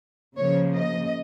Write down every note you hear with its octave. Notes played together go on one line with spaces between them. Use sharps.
C#3 F3 A#3 C#5
D#5